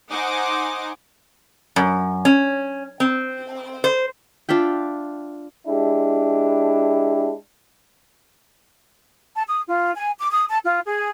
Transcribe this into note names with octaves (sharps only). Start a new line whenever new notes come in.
D#4 C5 F#5 G#5 D6
F#2
C#4
C4
C5
D4 F4 E5 G5
G#3 D4 E4 G4
A5
D#6
F4
G#5
D6
D#6
A5
F4
G#4